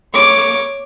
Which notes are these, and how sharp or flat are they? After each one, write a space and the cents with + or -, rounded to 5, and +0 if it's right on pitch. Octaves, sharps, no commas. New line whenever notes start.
C#5 +0 D6 +0